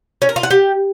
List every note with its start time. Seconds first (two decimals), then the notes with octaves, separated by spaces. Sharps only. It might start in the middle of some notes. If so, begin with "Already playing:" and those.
0.22 C#4
0.29 A#4
0.36 F4
0.43 F#5
0.50 G4